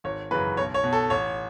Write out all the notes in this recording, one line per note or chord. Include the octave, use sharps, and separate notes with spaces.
G#1 C#5
F#2 C#3 E3 B4
B1 C#5
C#5
B2
A4
A1 C#5